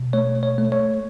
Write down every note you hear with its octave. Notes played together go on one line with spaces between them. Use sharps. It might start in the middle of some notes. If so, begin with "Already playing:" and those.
Already playing: B2
A3 C#5
C#5
A3
C#5